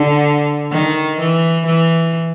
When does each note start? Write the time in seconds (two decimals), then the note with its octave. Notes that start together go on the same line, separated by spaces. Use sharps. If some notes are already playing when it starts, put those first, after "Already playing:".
Already playing: D3
0.71 D#3
1.19 E3
1.66 E3